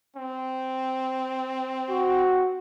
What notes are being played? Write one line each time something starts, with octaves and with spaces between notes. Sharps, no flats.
C4
F#4